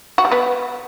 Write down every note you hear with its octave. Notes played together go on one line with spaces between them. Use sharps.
F#4
G3
B3